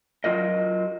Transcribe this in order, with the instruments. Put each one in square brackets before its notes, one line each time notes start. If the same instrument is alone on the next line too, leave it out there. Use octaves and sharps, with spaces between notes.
[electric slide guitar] F#3 F4 A#4 D#5